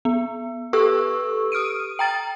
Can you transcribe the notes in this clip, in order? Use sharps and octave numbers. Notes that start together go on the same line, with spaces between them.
B3
G4 A4 B4 C#6 E6
D#6 F6 D7 D#7
G5 A#5 A6